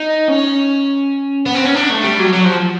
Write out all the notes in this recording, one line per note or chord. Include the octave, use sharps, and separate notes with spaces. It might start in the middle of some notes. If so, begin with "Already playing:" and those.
Already playing: D#4
C#4
B3
C4
C#4
D4
A3
G3
F#3
F#3
F3